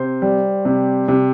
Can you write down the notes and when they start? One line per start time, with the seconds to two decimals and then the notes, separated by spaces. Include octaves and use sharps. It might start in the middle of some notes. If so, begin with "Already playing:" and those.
Already playing: C3 C5
0.22 G3
0.65 C3
1.08 C3